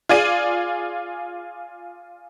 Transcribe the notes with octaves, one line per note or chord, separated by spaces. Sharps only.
F4 G#4 D5 D#7